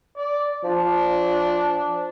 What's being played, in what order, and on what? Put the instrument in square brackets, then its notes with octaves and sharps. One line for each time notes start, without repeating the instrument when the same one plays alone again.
[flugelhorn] D5
[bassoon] F3 [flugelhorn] D4